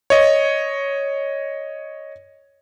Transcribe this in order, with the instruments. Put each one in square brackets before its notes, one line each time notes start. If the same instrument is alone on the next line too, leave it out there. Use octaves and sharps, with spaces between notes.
[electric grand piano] C#5 D#5